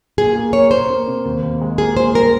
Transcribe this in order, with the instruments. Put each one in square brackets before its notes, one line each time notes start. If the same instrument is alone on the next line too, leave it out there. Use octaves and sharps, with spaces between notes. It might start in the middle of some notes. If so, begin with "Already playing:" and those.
[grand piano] A#2 [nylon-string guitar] G#4
[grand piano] A#3
[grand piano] A#3 [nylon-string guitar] C#5
[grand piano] A#3 [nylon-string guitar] C5
[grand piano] A#3
C3
D#2
D#2
G#3
[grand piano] A#3 [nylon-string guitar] G#4
[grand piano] A#2 [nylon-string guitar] C5
[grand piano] G3 [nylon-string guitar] A#4